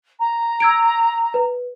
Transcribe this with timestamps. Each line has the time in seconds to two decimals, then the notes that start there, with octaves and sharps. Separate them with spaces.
0.19 A#5
0.60 E6 G#6 D7
1.34 B4